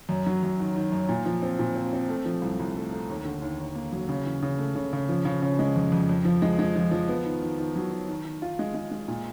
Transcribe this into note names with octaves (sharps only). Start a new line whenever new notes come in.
F#2
F#3
F#2
D#3
D#3
F#2
A#2
F3
C4
A#2
C4
C4
A3
F3
C2
C2
A3
A3
D#2
D3
D#2
D#2
A#3
F#3
C#3
E3
C#3
A3
C#3
C#3
F3
C#3
C#3
G#3
F2
F2
F2
F3
G#3
G#3
F3
F3
B3
D#3
D#3
D#3
F#3
D#3
D#3
D#3
F4
G#3
G#3
G#3
A#2